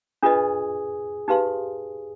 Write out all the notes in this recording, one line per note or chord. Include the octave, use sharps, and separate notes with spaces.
D4 F4 G#4 B4 D#5
D#4 G4 B4 F5 C6